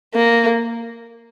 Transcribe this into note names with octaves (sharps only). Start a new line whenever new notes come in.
A#3